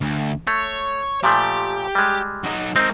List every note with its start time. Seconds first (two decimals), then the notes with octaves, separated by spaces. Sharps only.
0.01 D2
0.47 A3 C#5
1.24 A#2 F3 A3 G4
1.95 G3 G#3
2.44 F#3 D#4
2.76 G#3 C4 D#4 A#4